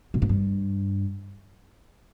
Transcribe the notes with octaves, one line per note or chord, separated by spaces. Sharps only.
B2
G#2
G2